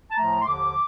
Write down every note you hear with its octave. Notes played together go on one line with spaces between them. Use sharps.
A5
A2 F3 A3 A#5
C6
D#2 D3 F3 D6